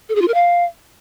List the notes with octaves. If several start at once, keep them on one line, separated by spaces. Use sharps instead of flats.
A4
G#4
F4
A#4
F5